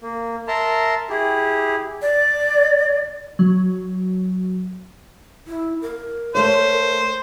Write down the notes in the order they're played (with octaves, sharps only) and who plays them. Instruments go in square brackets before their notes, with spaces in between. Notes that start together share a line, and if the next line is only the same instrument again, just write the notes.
[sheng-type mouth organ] A#3
A#4 E5 A5 A#5 C6
E4 G4 G#4
[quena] D5
[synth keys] F#3
[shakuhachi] E4
A#4
[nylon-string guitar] A3 C#5 [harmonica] C5